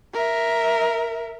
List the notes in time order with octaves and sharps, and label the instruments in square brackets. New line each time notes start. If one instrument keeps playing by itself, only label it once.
[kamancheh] A#4 E5